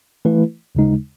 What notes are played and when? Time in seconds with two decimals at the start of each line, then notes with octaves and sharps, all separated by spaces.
0.25 E3 A3 E4 B4
0.75 D#2 C#3 G#3 D#4